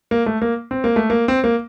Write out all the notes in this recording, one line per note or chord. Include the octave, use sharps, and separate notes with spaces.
A#3
A3
A#3
C4
A#3
A3
A#3
C4
A#3